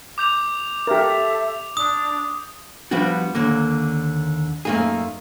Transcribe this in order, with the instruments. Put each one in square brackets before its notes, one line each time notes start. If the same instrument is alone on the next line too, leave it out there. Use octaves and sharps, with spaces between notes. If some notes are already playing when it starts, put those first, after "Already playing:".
[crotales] D6 G6 F7
[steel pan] G4 A#4 [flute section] A4 E5
[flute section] D4 [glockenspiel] D#6
[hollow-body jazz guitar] F3 G3 B3 D4 F#4
D#2 D3 A#3
F#2 A3 A#3 D#4 G#4